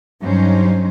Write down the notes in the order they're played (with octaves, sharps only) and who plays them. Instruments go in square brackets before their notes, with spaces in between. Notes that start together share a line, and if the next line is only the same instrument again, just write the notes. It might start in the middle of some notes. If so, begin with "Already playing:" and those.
[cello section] G2 F#3 C#4 D#4 C5